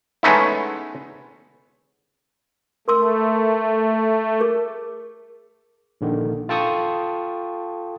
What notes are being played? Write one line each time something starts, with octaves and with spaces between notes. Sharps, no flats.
G#3 A3 B3 C#4 D#4 E4
A3 A#4 C6 E6
G#4 A#4
A#1 D3 D#3
F4 A4 G5 A5 C#6 D#6